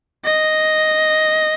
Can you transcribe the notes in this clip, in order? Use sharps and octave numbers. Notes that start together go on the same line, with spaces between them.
D#5